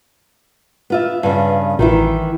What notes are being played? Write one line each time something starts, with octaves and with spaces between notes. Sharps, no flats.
B3 F4 E5
G2 C#3 B3
A1 D#3 E3 E4